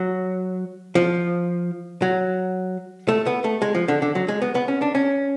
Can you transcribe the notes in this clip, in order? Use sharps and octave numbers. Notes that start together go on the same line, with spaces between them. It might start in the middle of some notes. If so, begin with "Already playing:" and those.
Already playing: F#3
F3
F#3
A3
B3
A3
G#3
F3
D3
D3
F#3
G#3
B3
B3
C#4
D4
C#4